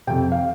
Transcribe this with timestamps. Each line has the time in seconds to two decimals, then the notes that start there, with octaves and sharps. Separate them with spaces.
0.07 F2 C3 G5
0.32 F5